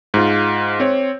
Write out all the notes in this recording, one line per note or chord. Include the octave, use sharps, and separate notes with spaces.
G#2 F4
C4 C#5